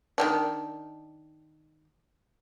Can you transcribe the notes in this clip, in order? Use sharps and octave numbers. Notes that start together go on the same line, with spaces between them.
D#3 E3 D4